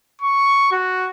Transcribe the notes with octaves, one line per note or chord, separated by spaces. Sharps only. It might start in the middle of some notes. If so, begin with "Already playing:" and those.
C#6
F#4